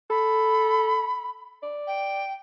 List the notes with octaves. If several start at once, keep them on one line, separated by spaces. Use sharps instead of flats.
A4 B5
D5
G5